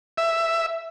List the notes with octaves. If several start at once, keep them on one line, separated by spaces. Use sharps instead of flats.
E5